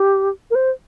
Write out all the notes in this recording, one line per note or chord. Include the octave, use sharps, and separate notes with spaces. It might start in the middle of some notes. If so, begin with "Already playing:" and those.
Already playing: G4
A#4
C5